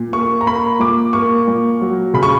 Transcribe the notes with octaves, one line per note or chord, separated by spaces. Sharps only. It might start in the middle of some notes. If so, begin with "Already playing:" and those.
Already playing: A#2
A#3 C#6
A#5
A#3 B5
A#2 D6
A#3 C#6
A#2
F#3
C#3 B5
C#6